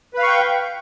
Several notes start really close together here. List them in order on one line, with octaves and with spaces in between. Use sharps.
B4 F5 C#6 G5